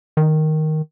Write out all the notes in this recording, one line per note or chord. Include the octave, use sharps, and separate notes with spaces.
D#3